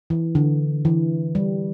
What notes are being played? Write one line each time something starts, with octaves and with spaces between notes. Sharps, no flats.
E3
D3
E3
G3